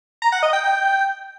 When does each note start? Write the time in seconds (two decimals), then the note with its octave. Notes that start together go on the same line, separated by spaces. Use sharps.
0.22 A#5
0.32 F#5
0.43 D#5
0.53 G5
0.63 G5